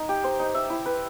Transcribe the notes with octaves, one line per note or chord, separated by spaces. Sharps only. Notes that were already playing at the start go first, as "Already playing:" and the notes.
Already playing: D#4
G4
C5
D#4
E5
E4
B4